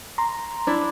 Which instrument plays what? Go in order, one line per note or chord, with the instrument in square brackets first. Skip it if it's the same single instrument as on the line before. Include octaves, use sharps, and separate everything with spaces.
[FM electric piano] A#5 C6
[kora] D4 E4